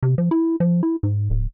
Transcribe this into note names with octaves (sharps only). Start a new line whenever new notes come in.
C3
F3
E4
F3
E4
G#2
D1